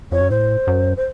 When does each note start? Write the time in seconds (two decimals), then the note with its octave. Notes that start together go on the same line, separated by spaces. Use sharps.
0.12 F2 C#5
0.21 F#2
0.30 A2 C5
0.67 F#2
0.96 C5